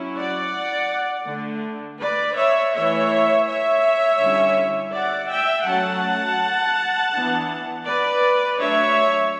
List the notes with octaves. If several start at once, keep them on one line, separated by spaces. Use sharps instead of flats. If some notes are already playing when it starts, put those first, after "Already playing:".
Already playing: F#3 C#4 E4
D5 F#5
D3 A3 D4
B4 D5
C#5 E5
E3 A3 E4 C#5 E5
C#5 E5
D3 G3 C#4 E4
D5 F#5
E5 G5
F#3 A3 C#4 F#5 A5
E3 B3 D4
B4 D5
F#3 A3 D4 C#5 E5